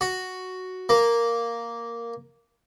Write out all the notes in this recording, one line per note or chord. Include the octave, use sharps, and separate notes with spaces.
F#4
A#3